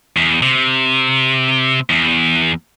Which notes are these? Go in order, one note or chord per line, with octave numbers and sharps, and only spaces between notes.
E2
C3
E2